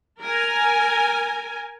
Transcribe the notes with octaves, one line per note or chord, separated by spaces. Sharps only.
A#4 G#5